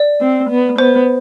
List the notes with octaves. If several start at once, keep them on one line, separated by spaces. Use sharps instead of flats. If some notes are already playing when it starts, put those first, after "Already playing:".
Already playing: D5
C4
B3
B3 C5